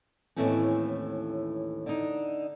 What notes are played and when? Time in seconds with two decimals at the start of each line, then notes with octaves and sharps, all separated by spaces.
0.36 D#2 A2 E3 A3 C4 C#4
1.86 D3 D#4